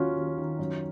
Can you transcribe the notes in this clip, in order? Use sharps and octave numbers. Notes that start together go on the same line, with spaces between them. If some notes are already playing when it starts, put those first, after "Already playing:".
Already playing: D#2 F#3 C#4 F4 F#4
D#2
D#3
F#2